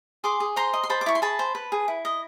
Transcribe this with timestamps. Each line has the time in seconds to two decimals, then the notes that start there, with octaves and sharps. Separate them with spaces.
0.24 G#4 C6 D6
0.40 G#4
0.56 C5 A#5 C6
0.73 D#5
0.83 C6
0.90 C5 A5 B5
1.01 D6
1.06 E4 C#6
1.15 C6
1.22 G#4 A5 B5
1.39 C5
1.55 B4
1.72 G#4
1.88 E4
2.05 D#5